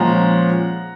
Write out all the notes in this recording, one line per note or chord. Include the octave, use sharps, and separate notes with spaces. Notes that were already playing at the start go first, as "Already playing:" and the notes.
Already playing: A#2 F3 G#3 C#4 F#5 A#5